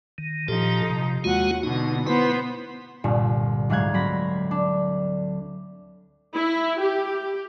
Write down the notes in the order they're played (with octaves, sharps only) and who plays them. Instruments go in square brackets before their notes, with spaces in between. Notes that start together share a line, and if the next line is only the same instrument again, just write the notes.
[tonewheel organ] D#3
[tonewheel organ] A#2 G4 A4 [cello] F3 D#4
[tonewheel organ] C3
[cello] D#2 F#5 [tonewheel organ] G#3 F4 F#4
[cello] B2 D3 [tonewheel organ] D#4
[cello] B3 C5 [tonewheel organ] E4 B4
[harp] C2 G2 A#2 D3
D2 G#2 F#3 F5 F#6 G#6
F#3 C4 B5 A#6
D4
[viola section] E4
G4